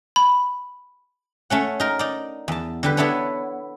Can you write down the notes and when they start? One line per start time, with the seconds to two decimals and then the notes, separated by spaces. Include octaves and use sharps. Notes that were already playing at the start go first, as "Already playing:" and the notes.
0.16 B5
1.50 A3 C#4 F#5
1.80 D#4 A#4
1.99 D#4 D5
2.48 E2 A5
2.83 D3 G3 B4
2.97 B3 D4 E4 A4 C#5